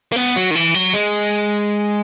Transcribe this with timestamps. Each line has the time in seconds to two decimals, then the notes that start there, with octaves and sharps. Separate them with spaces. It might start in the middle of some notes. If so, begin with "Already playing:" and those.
0.12 A#3
0.16 B3
0.36 F#3
0.51 D#3
0.55 E3
0.74 F#3
0.94 G#3